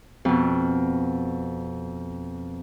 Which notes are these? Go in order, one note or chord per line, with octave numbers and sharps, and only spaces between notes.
F2 B2